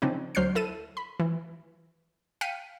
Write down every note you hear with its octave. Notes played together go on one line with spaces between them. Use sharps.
C#3 F3 C4 D4 D#4
D2 F#3 C5 F6 G6 C7
E4 A4 D#7 E7
B5
E3
F5 G5 B6 C#7 D#7